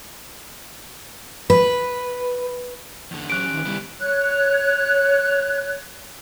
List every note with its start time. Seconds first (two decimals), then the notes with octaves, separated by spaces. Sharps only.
1.50 B4
3.11 E2 D3
3.30 E3 F#3 C#4 G4 F#6 D7
3.51 D#3
3.65 C#3 G3 B3 E4
4.00 C#5 F#6